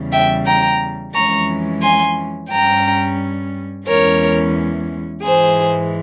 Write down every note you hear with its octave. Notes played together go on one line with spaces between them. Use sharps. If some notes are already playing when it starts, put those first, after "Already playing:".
Already playing: E2 C#3 G3
E5 G5
G5 A#5
F2 E3 G#3 C#4 A#5 C#6
G#5 C6
G2 G3 C#4 G5 A#5
E2 E3 G#3 C#4 A#4 C#5
G#2 E3 G#3 G#4 C5